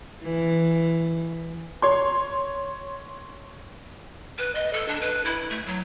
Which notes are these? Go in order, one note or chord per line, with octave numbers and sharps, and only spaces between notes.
E3
C#5 C6
B4
D#5
A4
D4
B4
E4
A3
F#3